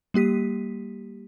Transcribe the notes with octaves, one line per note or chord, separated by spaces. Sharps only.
G3 A#3 G4 B6 D#7